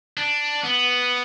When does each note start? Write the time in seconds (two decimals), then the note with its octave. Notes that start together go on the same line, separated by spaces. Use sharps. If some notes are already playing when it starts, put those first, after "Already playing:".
0.18 D4
0.64 B3